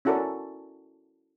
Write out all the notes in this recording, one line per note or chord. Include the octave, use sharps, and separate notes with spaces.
C#4 E4 F#4 A4 A#4 D5